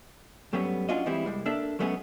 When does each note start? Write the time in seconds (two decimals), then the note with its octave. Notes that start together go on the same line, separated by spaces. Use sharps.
0.53 G2 F#3 G3 A3 B3 C#4
0.89 C#4 D4 F4 F#4 D#5
1.06 E3 G3 G#3 C4 E4
1.26 C2 G3 G#3
1.46 A#3 D4 A4 E5
1.79 F#3 G#3 A3 B3 C#4 G#4